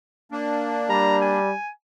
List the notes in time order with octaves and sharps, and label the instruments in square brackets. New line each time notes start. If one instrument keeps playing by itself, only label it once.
[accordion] A#3 D4
[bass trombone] G3 [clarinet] A#5
[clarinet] G#5